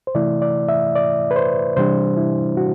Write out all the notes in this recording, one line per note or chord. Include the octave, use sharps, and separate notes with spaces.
C5
C3 E3 A3 E4 D5
D5
E5
D5
B4
C5
C3 E3 G3 D4 C5
E4
F#4